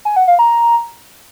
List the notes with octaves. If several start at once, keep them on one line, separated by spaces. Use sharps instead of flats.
G#5
F#5
F5
A#5